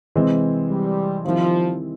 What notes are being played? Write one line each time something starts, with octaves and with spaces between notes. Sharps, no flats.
C3 E3 G#3 C4
G3
D#3 F3 G3 C4 E4